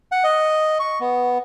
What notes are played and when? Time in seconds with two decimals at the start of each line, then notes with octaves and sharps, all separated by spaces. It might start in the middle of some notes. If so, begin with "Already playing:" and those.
0.12 F#5
0.24 D#5
0.79 C#6
1.00 B3